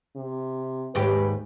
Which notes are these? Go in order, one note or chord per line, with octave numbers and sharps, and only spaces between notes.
C3
D#2 G#2 G4 B4